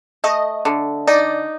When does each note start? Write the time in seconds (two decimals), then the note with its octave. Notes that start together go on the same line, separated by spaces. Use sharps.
0.24 A3 D#5
0.65 D3
1.07 D#4 D5